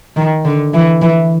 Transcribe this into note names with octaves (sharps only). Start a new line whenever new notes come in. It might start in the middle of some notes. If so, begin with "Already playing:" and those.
D#3
D3
E3
E3